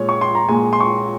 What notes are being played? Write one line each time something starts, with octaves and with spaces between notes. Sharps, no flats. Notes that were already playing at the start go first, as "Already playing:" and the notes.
Already playing: A#2 G#3 C#5
C#6
C6
A#5
A#2 G#3 G#5
C6
C#6